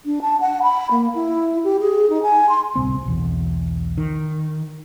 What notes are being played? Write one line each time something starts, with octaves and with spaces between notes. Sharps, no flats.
D4
A5
F#5
B5
A#3
E4
G4
G#4
D#4
G#5
C6
D1 C2 C4
B1 E2
D#3